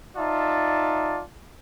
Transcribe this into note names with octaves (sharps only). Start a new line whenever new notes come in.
D#4 F4 D5 E5 A5